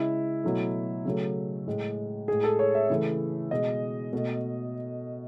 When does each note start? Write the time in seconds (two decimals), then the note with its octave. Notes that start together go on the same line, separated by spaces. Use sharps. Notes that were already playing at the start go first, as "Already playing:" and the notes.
Already playing: C#3 G#3 E4
0.44 B2 F#3 A3
1.05 C#3 F#3 A3
1.67 A2 G#3
2.28 A2 G#3 G#4
2.44 A4
2.59 C#5
2.75 E5
2.90 C#3 E3 A3
3.51 B2 G#3 D#5
4.13 B2 A3